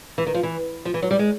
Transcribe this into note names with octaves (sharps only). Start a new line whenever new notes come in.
E3
D#3
F3
E3
F3
E3
F#3
G3
G#3